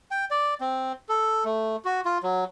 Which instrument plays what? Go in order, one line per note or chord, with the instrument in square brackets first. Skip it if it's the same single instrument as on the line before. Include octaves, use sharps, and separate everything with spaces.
[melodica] G5
D5
C4
A4
A3
F#4
F4
F#3